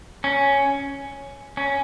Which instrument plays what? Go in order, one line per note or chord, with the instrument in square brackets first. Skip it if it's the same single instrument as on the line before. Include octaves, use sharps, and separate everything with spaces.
[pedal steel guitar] C#4
C#4